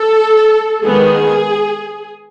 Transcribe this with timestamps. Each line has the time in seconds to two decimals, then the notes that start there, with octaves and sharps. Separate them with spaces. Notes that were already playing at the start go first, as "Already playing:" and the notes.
Already playing: A4
0.83 D#3 G#3 B3 G#4